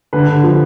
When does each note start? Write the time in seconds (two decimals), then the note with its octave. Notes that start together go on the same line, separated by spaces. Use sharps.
0.13 D3 B4
0.28 D3
0.43 F3